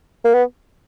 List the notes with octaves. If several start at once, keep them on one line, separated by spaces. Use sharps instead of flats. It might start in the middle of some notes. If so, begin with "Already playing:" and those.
A#3
B3